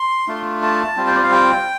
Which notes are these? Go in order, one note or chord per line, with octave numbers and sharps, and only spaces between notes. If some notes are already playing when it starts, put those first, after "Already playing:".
Already playing: C6
A3 D4 F4
A5
G3 C4 F4
C5
D5
F5
G5